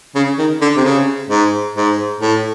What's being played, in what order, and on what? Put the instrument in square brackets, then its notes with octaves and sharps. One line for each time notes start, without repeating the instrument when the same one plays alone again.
[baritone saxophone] C#3
D#3
D3
C3
C#3
G#2
G#2
A2